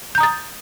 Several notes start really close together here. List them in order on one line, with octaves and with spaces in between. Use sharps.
G6 A#5 D#6 A6